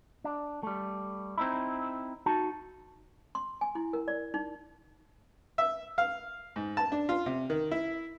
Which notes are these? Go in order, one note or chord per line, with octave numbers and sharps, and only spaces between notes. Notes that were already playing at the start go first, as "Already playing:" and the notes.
D4
G3 A3
C4 D#4 E4
D#4 F#4 A5
C6
G#5
E4
A#4
D5
D#4
E5
F5
G#2
A5
D4
F4
C3
D#3
E4